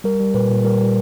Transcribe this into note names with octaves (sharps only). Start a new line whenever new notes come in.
G3 A#4
G3
A#2 B4
A#2
G3 A#4
G3